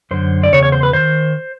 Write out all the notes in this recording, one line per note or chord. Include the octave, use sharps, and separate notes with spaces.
F#2 D3 C5
D5
E2 C#3 C#5
C#5
C5
B4
D#3 C5